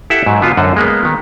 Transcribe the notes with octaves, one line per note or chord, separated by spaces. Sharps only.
E4 G4 A4 E5 F#5
G#2 F#3
D3 B3 F4 F#4 C#5
F#2 D3 C5 D#5 F#5
G#3 A#3 B3
D#3 B3